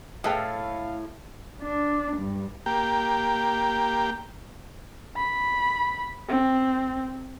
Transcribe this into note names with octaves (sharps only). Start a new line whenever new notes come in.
A2 G#4 B4 E5 F5 G5 A5 F6
D4
G2
A#3 G4
B5
C4